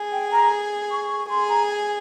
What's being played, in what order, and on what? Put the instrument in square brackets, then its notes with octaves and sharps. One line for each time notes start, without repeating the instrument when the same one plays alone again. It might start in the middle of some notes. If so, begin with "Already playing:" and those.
Already playing: [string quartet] G#4
[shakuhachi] G5
A#5
C#6
[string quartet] G#4 [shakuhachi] C6
[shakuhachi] A#5
G#5